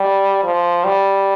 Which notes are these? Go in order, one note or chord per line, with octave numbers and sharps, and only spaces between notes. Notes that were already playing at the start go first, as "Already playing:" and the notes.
Already playing: G3
F3
G3